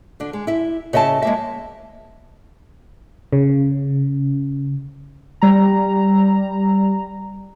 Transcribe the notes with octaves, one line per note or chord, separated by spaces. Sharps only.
D3 D4
G#3
E4 E5
C#3 D#5 E5 G5 A5
G#3 A#3 E5
C#3
G3 A#5